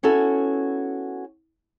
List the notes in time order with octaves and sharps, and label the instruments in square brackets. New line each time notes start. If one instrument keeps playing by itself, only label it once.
[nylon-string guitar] B3 C#4 E4 F#4 A4